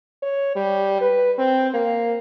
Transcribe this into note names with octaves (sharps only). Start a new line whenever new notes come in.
C#5
G3
B4
C4
A#3